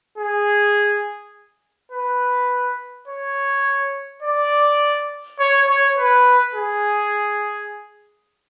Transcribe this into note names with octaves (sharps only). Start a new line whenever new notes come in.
G#4
B4
C#5
D5
C#5
C#5
B4
G#4